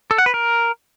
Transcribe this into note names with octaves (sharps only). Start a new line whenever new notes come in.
A4
F#5
B4
A#4